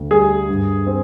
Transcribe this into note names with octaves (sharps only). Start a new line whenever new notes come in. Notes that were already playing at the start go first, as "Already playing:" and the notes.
Already playing: D2
G3 G#4
G2
C4